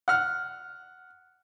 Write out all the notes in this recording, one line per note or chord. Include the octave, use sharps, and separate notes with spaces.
F#5 F6